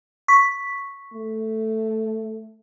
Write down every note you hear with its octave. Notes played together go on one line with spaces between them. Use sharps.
C#6 B6
A3